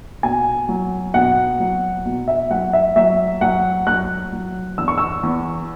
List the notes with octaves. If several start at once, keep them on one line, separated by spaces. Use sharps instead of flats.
B2 G#5
F#3
B2 F#5
F#3
B2
E5
F#3 F#5
E5
F#3 E5
F#3 F#5
F#3 F#6
F#3
E2 E6
C#6
E6
E2